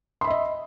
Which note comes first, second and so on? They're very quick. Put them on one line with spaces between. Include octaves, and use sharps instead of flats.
C6 B5 E5 D#5